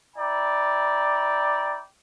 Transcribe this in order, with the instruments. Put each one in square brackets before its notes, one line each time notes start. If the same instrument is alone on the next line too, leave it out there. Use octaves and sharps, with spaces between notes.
[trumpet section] E4 D5 G5 A#5